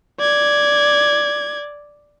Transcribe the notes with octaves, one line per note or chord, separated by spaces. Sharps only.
D5 G#6